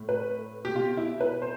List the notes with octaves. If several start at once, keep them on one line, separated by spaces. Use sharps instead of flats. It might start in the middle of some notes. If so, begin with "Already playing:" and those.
Already playing: A2
B4
G4
B2 F4
E4
B4
C5